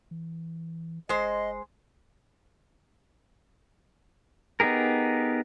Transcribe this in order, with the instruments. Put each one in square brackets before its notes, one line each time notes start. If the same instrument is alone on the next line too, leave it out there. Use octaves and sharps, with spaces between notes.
[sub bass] E3
[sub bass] F#1 [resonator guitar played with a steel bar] G#3 C5 [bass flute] D#5
[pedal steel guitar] B3 D#4 G4 G#4 A#4